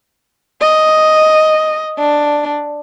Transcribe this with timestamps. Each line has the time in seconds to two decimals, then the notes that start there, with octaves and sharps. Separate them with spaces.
0.61 D#5
1.98 D4